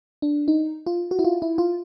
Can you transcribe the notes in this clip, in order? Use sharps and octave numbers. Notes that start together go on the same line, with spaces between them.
D4
D#4
F4
F#4
E4
F4
E4
F4